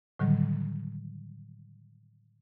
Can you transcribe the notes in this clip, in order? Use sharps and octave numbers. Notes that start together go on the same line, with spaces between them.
A2 D3 D#3 F#3 G3